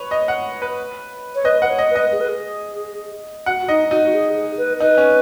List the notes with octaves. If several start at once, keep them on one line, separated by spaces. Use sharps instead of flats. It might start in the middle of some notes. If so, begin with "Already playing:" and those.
Already playing: B4 C#5
D#5
F#5
B4
C#5
B4 D#5
B4 F#5
C#5
D#5
B4
D#5
G#4
B4
G#4
F#4 F#5
D#4 D#5
D#4 F#4
G#4
G#4
B4
D#4 B4
C#4